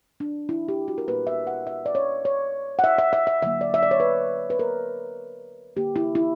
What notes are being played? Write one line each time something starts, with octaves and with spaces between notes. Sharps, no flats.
D4
E4
G4
F#4
A#4
A#2 G3 A#3 B4
E5
F#5
E5
D5
C#5
C#5
F#5
E5
E5
E5
E5
D3 F#3 A#3 E5
D5
E5
D5
C#5
B4
B4
A#4
D3 A#3 G4
E4
E4